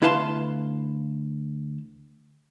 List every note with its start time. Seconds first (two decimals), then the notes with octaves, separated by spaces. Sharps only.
0.02 D2 E4 B4 F5 A5 C6